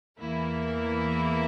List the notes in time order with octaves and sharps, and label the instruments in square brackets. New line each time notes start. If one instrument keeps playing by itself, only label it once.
[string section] E2 E3 A#3 E4 A#4